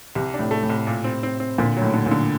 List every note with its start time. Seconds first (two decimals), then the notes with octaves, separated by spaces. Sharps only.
0.15 C2 C3
0.34 D4
0.39 A2
0.51 A3
0.63 A2
0.70 C2
0.87 A#2
1.04 C4
1.23 C4
1.40 C4
1.58 A#2 D3
1.77 A2 F#3
1.93 D3
2.06 A#2
2.11 D3